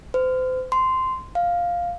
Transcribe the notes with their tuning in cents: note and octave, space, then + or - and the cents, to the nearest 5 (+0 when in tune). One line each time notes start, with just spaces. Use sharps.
C5 -35
C6 -10
F5 +5